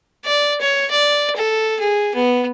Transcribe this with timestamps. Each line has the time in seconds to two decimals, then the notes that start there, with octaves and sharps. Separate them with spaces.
0.25 D5
0.61 C#5
0.90 D5
1.36 A4
1.80 G#4
2.15 B3